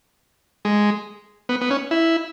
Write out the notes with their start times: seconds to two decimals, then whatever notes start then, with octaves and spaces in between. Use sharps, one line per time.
0.65 G#3
1.49 B3
1.61 B3
1.70 C#4
1.91 E4